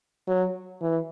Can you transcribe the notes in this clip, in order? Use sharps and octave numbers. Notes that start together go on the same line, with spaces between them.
F#3
E3